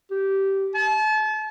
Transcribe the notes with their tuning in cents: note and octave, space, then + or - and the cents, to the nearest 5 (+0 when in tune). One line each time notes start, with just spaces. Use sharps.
G4 -15
A5 -35